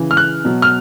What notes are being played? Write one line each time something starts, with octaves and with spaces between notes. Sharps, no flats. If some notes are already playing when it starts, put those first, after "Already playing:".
Already playing: C#3 E3
F6
F#6
B2 F#3
F6